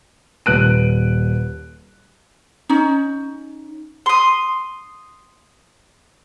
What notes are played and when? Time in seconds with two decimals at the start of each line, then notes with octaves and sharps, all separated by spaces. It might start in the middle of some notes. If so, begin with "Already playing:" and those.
0.46 D#1 B4 F#6 D7 D#7
2.69 C#4 D#4
4.06 C6 D#6